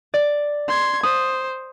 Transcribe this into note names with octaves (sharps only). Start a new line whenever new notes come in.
D5
C6 G#6
C5 D#6